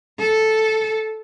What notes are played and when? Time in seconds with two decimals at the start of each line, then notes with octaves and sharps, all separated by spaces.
0.19 A4